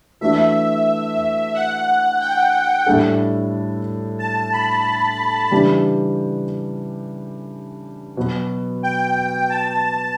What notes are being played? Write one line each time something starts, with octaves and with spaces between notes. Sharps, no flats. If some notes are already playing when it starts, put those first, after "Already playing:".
E3 A3 D4 F#4 E5
F#5
G5
A2 G3 D4 A4
A5
B5
C#3 E3 G3 D4 G4
B2 F#3 B3
G5
A5